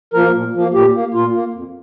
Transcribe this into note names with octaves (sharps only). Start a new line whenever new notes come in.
F3 A#3 A#4
A#2
F3 A#3
A#2 G4
A#3
A#2 F4
A#3
F2